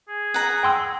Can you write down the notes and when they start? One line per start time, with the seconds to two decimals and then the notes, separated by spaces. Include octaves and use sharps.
0.08 G#4
0.34 F#5 A#5
0.63 G5 C6 E6